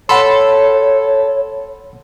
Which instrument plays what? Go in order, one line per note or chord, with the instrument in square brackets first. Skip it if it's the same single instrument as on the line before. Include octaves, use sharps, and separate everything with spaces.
[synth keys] A4 [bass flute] C#5 [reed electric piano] F#5 B5 C6